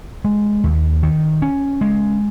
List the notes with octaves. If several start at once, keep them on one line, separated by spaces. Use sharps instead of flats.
G#3
D#2
D#3
C#4
G#3